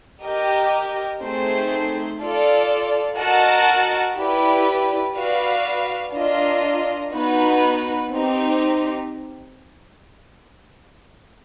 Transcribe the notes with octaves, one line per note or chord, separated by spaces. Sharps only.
G4 A#4 D#5
A3 C4 D#4 G#4 C5
F4 A4 D5
F#4 A#4 D#5 F#5 A5
E4 G4 B4 D5
F#4 B4 D5 F5
D4 F4 A#4 D#5
B3 D#4 F#4 B4
C4 D#4 G4